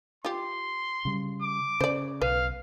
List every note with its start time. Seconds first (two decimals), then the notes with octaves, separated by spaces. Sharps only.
0.25 F4 G4 C6
1.05 C#3 G3
1.42 D6
1.80 C#3 C5 D5
2.22 B1 B4 F5